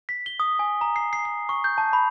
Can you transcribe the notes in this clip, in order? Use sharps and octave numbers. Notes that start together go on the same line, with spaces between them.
B6
G7
D#6
G#5
A#5
C7
C7
C7
C#6
G6
A5
B5